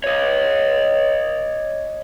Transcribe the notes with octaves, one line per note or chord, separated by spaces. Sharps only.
C#5 D#5